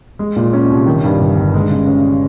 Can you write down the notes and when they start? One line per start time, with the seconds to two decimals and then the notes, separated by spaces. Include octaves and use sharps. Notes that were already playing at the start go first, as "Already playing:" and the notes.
0.19 G#3
0.36 A#2
0.53 C#4
0.70 C2
0.86 D#3
1.04 G2
1.20 G1
1.37 G1
1.54 G#3
1.70 C#3
1.87 C#4